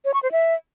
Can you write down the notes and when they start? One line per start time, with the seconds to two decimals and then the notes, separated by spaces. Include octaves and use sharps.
0.05 C#5
0.14 C#6
0.23 C5
0.32 E5